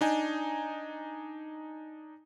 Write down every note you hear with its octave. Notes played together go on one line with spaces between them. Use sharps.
D4 D#4 G#5